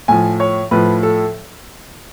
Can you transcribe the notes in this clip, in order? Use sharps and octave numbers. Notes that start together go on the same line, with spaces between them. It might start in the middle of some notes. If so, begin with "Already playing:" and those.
A2 F3 G#5
C#5
A2 F3 B4
A4